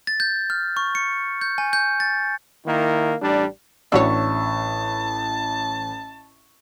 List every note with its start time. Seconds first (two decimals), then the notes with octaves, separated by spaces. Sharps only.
0.07 A6
0.20 G6
0.50 F6
0.77 C#6
0.95 C#7
1.41 G6
1.58 G#5
1.73 G6
2.00 A6
2.66 D#3 A#3 E4
3.22 A1 G3 D4
3.92 A1 D4 F#4 C#5 E5 A5 C#6 E6